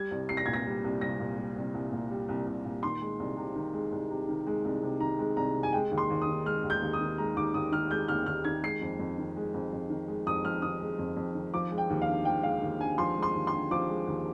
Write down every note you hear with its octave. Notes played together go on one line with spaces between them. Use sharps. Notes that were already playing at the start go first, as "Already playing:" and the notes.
Already playing: G3 G#6
C2
C2 C7
A#6
A#2 G#6
A#6
G3
C2
C2 A#6
A#2
G3
C2
C2
A#2
G3
C2
C2
A#2
D#3 C6
G#3
C2
C3
D#3
G#3
C2
C3
D#3
G#3
C2
C3
D#3 A#5
G#3
C2 A#5
C3
G#5
G#3 G5
D#2
C6
D#2
D#6
D#3
G#3 F6
D#2
G6
D#2
D#6
D#3
G#3 A#5
D#2 D6
D#2 D#6
D#3 F6
G#3 G6
D#2 F6
D#2 F6
D#3 G#6
G#3 C7
F2
F2
D#3
G#3
F2
F2
D#3
G#3
F2 D#6
F2 F6
D#3 D#6
G#3
F2
F2
D#3
F3 D6
G#3
G5
D#2
F5
D3
F3 G5
G#3 F5
D#2
D3 G#5
F3 C6
G#3
C6
D#2
C6
D3
F3 D6
G#3
D#2